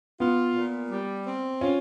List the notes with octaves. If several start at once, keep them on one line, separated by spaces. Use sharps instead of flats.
B3 F4
A#2
G3
C4
C#4 F4